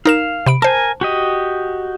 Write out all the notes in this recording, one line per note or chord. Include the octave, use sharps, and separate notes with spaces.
D#4 A#4 F5 E7
C3 B5 D7
A#4 C5 G#5 A5
F#4 G4 D#5